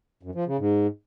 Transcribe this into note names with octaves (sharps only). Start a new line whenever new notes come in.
F#2
F3
C#3
G#2